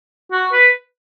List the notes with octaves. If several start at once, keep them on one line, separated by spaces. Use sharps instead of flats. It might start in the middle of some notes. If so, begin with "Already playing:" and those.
F#4
B4